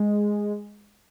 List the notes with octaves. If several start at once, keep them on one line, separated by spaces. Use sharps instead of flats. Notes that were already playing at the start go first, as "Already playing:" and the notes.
Already playing: G#3